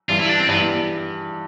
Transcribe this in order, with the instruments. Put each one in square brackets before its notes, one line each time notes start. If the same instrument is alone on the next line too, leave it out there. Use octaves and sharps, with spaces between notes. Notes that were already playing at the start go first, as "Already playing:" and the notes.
[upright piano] G2 E3 G3 [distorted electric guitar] F4
[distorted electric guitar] E4
D4
C4
[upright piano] G2 E3 G3 [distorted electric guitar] B3